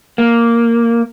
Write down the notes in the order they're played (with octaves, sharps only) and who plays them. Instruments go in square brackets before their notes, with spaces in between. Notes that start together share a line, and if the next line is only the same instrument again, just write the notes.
[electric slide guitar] A#3